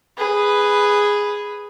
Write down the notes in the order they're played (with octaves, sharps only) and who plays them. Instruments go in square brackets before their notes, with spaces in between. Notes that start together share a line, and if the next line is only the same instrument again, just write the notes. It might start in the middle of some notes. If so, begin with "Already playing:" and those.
[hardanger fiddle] G#4 B4